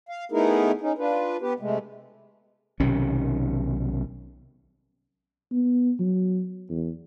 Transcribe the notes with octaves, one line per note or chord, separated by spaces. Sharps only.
F5
A3 B3 D#4 E4 G#4 A#4
C#4 D#4
D4 F4 B4
B3 G4 B4
C3 G#3 A3
B1 C3 D#3 C#4
B3
F#3
E2